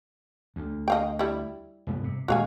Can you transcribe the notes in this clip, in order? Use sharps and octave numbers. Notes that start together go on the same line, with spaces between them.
D2
D#5 F5 G5
G3 E4
F1 G2 B3
C3
D#1 D2 G#3 F#4 F5 G#5